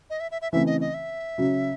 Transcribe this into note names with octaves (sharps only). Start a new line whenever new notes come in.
D#5
E5
E5
E5
C#3 E3 A3 C4 E5
D#5
D#5
E5
C#3 F#3 C#4